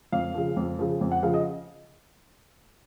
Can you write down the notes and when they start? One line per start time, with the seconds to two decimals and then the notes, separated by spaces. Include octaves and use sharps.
0.12 F2 F5
0.34 C#3 F3
0.56 F2
0.79 C#3 F3
1.01 F2
1.11 F#5
1.23 C#3 F3 F5
1.34 D#5